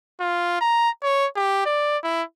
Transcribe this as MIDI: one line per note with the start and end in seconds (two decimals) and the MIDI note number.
0.21 0.59 65
0.61 0.89 82
1.03 1.26 73
1.36 1.64 67
1.66 1.98 74
2.04 2.23 64